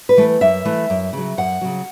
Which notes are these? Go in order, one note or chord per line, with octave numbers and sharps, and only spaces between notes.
B4
E3 A3
F#2 E5
E3 A3
F#2
C#3 F#3
F#2 F#5
C#3 F#3